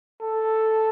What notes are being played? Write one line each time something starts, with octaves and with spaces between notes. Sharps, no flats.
A4